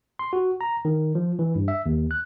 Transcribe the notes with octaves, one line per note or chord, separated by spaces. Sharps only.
C6
F#4
A#5
D#3
F3
E3
G2
E5
D#2
F#6